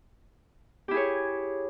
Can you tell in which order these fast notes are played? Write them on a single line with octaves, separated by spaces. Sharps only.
G4 E4 G#4 C#5